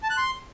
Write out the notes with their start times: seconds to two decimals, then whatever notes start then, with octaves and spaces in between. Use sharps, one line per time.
0.03 A5
0.10 F#6
0.17 C6